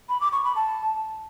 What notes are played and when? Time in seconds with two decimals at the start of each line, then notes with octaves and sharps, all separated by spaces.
0.09 B5
0.21 D6
0.32 C#6
0.44 B5
0.56 A5